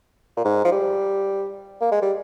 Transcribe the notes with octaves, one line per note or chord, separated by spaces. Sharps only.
A#2
G#2
F3
G3
A#3
G#3
G3